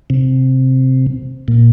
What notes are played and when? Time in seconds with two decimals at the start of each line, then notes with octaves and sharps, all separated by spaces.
0.10 C3
1.48 A#2